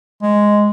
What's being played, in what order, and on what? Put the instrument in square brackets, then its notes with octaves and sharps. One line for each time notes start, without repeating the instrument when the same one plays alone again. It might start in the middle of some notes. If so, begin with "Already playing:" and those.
[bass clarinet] G#3